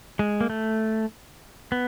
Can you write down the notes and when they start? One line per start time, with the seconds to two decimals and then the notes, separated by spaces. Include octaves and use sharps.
0.19 G#3
0.41 A#3
0.50 A3
1.72 B3